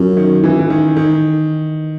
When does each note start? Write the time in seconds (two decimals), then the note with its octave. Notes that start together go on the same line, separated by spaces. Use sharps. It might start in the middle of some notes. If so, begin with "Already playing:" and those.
Already playing: F#2
0.17 D#3
0.44 E3
0.59 E3
0.70 D#3
0.97 D#3